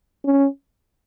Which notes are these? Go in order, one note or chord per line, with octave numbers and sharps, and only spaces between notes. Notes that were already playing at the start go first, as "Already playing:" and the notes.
C#4